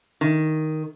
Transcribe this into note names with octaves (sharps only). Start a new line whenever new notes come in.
D#3